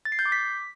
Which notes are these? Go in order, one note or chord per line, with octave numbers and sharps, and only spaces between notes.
A6
C7
G6
D6
B6